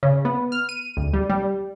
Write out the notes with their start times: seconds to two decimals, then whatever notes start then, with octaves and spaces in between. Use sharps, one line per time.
0.03 C#3
0.25 B3
0.52 F6
0.69 D#7
0.97 D2
1.13 G3
1.30 G3